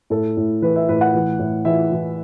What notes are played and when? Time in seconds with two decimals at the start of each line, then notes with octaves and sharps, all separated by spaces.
0.10 A2 A4
0.37 A2
0.62 E3 B4
0.76 E5
0.89 A2 B4
1.01 F#5
1.15 E3
1.39 A2
1.65 E3 E5
1.92 E3